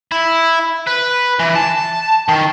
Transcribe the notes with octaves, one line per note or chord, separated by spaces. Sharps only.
E4
B4
E3
A5
D#3